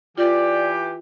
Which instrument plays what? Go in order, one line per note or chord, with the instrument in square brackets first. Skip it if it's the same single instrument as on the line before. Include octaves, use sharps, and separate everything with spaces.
[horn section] E3 G4 [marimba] F4 [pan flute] D5